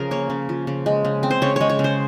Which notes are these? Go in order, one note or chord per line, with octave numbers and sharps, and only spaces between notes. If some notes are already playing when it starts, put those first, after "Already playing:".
Already playing: C#3 F3 G#4 A#4
A#3 C#5
C#3
F3
C#3
G#3
C#3
C4
C5
C#3 C#5
G#3 C#5
C#5
C#3
C5